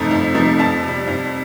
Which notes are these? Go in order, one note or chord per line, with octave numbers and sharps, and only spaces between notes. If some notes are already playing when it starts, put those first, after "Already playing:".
Already playing: F2 C3 F3 A3 D#4
F2
C3 F3 A3 D#4
F2 A5
C3 G3
F2